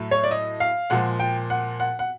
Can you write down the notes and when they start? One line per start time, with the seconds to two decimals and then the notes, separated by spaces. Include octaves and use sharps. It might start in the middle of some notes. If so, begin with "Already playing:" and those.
Already playing: A2 F#3 A3
0.11 C#5
0.24 D5
0.31 D#5
0.60 F5
0.90 A#2 F3 G#3 F#5
1.20 G5
1.50 F#5
1.80 F#5
1.99 F#5